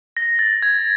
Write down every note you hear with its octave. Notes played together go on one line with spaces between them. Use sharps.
A#6
A6
G#6